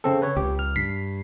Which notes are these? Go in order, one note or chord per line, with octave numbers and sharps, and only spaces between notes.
C#3 C4 A4
B4 C#5
C#2 G4
F6
G2 B6 C7